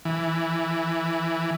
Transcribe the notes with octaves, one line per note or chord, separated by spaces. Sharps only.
E3